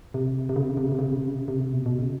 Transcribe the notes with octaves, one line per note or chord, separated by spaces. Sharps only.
C3
C3
C#3
C3
C#3
C3
C#3
C3
C#3
C3
C#3
C3
C#3
C3
C#3
C3
B2
B2
C#3